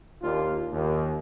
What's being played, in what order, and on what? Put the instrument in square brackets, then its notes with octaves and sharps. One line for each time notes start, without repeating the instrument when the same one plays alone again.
[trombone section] D#2 A#3 D4 F4
D#2